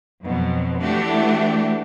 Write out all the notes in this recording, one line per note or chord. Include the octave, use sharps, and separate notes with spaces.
F2 B2 F#3
E3 A3 D4 F#4 G4